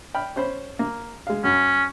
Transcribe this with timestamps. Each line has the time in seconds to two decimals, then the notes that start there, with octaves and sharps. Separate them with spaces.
0.14 G5 B5 F6
0.36 C#4 C5 B5
0.79 A#3
1.27 G#3 F5
1.44 F#2 C#4